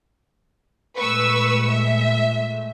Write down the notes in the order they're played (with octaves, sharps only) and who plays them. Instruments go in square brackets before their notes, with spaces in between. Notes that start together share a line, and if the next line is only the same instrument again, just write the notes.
[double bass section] A#2 G#3 A3 [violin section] B4 C#6 E6
[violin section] E5